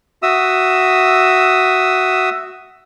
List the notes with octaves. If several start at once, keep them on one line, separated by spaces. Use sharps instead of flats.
F#4 E5 D#6 E6